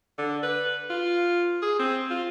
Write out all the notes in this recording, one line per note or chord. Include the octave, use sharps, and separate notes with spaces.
D3
B4
F4
G#4
C4
F4